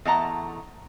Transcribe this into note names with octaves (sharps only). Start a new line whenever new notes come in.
E2 A3 D#5 F#5 A5 A#5